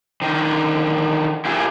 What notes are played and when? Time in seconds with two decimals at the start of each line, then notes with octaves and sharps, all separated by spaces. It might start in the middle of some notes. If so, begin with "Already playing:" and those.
0.22 D3 D#3
1.45 E4 F4 G4 G#4 A#4